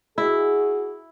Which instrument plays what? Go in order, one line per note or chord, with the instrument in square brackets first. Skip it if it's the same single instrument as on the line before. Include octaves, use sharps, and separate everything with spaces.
[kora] E4 [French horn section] F#4 G#4